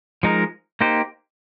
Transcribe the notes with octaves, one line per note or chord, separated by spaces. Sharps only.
F3 G#3 D#4 A#4
A#3 D#4 G4 C5